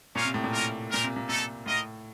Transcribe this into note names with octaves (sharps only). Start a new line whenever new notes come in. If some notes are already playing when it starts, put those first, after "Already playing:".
A#2 C#4 F4 A#4 C#5 F5
C3
A2
A#2
C#4 F4 A#4
A#2 C4 F4 A#4
C3
A#2
A#2 A3 D#4 A4
A2 F4 A#4 D#5